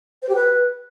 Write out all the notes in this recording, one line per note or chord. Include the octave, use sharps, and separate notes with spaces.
C5
G4
B4